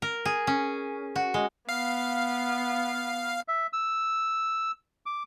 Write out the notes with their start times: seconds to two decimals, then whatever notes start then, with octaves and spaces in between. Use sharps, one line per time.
0.02 A#4
0.25 G#4
0.47 C#4
1.16 F#4
1.34 G#3
1.69 B3 F5
3.48 E5
3.73 E6
5.06 D6